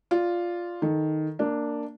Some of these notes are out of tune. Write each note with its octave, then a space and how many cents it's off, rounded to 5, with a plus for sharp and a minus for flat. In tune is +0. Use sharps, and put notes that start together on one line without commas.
F4 +0 D5 +0
D#3 +0 A4 +0
A#3 -15 D4 +0